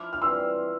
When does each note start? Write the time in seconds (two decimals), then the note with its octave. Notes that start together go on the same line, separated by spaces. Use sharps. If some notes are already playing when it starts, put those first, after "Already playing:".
Already playing: F3 E4 D6 F6
0.13 F6
0.22 E3 G3 C4 G4 C6 E6